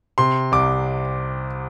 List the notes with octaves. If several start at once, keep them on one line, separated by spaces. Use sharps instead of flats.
C3 C6
C2 D6